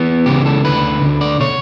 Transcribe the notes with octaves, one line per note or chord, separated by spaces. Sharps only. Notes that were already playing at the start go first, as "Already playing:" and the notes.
Already playing: E3 B3
C#2 C#3 E3 G4
A4
D2 D3 B4
D2 D3
D5
B2 C#5